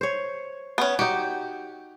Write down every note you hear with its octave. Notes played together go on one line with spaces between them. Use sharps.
C5 C#5
B3 C#4
D#4 F#4 G4